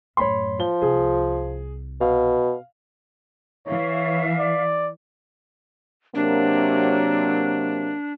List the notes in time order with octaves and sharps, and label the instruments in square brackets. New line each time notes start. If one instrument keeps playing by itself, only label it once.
[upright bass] F#2 A2 [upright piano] C#5 B5 C6
[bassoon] F3 [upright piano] G7
[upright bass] C2 [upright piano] G#4
[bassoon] B2 [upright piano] F5
[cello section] E3 [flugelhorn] C#5 [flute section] E5 F5
[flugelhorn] D5
[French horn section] C3 F#3 A#3 [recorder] D4